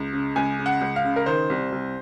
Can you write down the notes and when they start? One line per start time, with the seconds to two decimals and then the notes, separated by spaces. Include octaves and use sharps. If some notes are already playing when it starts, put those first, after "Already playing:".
Already playing: C#2
0.13 C#3
0.36 C#2 G#5
0.59 C#3
0.66 F#5
0.81 C#2
0.96 F5
1.04 C#3
1.16 A#4
1.26 D#3 C5
1.50 C2
1.72 C2